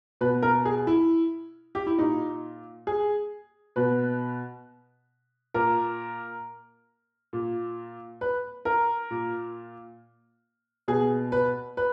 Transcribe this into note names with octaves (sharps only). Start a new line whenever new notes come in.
B2 B4
A#4
G#4
E4
G4
E4
A#2 D#4
G#4
B2 B4
A#2 A#4
A#2
B4
A#4
A#2
B2 G#4
B4
B4